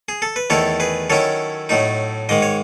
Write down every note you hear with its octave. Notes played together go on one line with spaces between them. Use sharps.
G#4
A4
B4
E2 D#3 A3 E4 A4 C#5
G#4 B4
D#3 F#3 C#4 E4 A4 C#5
A2 F#3 A3 D#4
G#2 D#3 G#3 D#5
C#5